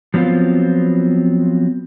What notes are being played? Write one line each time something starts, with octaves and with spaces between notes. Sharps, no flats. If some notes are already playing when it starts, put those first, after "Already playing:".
F3 F#3 B3 C4 F4